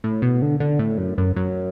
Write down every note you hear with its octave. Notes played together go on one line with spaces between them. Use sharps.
A2
B2
D3
D3
A2
F#2
F#2
F#2